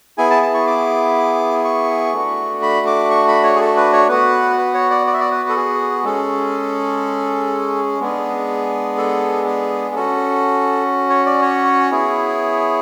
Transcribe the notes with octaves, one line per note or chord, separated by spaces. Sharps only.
B3 E4 G#4 G#5
A5
A5
C#6
D6
C#6
A3 D4 F#4
B5
D6
C#6
B5
C#5
G#4
A4
B4
C#5
B3 F#4 B4
B4
C#5
D5
D5
E5
D5
B4
A4
G#4
G#3 C#4 G#4 A4
G#3 B3 D4 G#4
A4
G#4
C#4 F#4 A4
C#5
D5
C#5
B3 E4 G#4